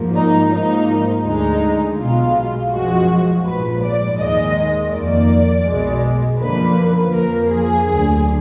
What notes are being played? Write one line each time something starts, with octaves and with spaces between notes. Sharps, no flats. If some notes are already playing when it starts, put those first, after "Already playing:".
Already playing: G#2 F3 A#3
D#4
G#2 F3 A#3 D#4
D2 D3 G#3 D#4
B1 B2 G#3 F4
F#2 F3 G#3 F#4
A#1 G#2 F3 B4
D5
D#2 D#3 G#3 D#5
F2 D#3 A#3 D5
B1 B2 G#3
F#2 D3 F3 A#3 B4
F2 F3 A#3 A#4
G#4
D2 D3 F#3